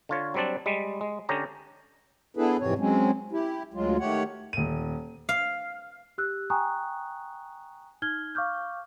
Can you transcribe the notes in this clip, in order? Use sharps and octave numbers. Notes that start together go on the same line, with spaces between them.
D3 F4 C#5
F#3 G3 C4 D4 D5
G3 G#3
G#3
D3 C#4 G4 A#5
B3 D4 E4 G#4 A4 B4
F2 G#2 C3 E3 C4 C#5
F#3 G#3 C4 C#4
E4 G4
D2 F#3 G#3 F4
D#3 A3 G4 C#5 F#5
D#1 D#7
F5
G4 E6 F#6
G5 G#5 A#5 C#6 D#6 F#6
D#4 F6 G#6 G7
F5 C#6 D6 F6 G6